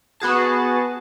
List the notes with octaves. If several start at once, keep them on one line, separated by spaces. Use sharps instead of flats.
B3 F#4 G#4 A5